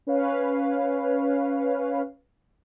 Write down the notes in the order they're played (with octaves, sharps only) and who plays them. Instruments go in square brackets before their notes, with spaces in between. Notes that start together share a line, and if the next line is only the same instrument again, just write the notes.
[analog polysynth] C#4 B4 C#5 F5